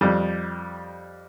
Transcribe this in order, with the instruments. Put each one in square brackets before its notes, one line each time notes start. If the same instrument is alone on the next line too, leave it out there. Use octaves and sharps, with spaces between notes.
[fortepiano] F2 G3